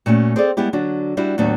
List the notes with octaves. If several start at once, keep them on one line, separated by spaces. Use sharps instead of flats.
A#2 A3 C#4 F#4
C4 G#4 A4 D5
G3 G#3 B3 E4 G4
D3 F#3 D4 F#4
G3 D4 E4 F#4
D#2 A2 F#3 B3 D4 F#4